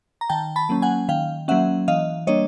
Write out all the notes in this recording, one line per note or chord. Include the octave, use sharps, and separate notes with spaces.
A#5
D#3 G5 A5
A5 B5
F#3 A#3 C#4
F#5 G#5
D#3 F5 G5
F#3 A#3 C#4 E5 F#5
E3 D#5 F5
G3 A#3 D4 C#5 D#5